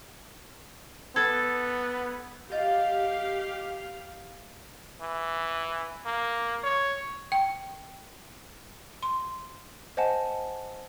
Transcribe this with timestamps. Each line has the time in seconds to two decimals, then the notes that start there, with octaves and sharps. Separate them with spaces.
1.16 B3 A4 G#6 A6
2.52 F4 G4 D#5 F5 G6
5.01 E3
6.05 A#3
6.63 C#5
7.32 G5
9.03 C6
9.97 C5 D#5 F#5 G#5 A5